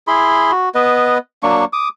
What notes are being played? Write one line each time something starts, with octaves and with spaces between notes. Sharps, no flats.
E4 G#4 B5 C6
F#4
B3 B4 D#5
F#3 A#3 D4 C#6
D6 D#6